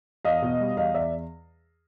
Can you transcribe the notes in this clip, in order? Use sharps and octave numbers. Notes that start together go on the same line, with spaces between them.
E2 D#5 F5
B2
G3
E2 D#5 F5
E2 D5 E5